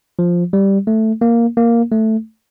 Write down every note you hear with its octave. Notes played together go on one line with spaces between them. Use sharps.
F3
G3
A3
A#3
A#3
A3